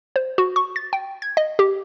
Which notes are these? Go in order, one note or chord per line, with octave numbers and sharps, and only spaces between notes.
C5
F#4
C#6
A6
G5
G#6
D#5
G4